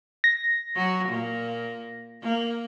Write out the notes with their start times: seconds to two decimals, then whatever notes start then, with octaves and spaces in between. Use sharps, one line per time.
0.24 A#6
0.75 F#3 F#4
1.08 A#2 A#3
2.22 A#3